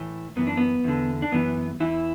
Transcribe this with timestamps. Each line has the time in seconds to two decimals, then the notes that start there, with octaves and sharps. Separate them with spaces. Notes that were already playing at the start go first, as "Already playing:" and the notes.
Already playing: A2 E3
0.36 F#2 E3 B3
0.47 D4
0.57 B3
0.84 E2 D3
1.22 D4
1.32 F#2 E3 B3
1.80 E2 E3 E4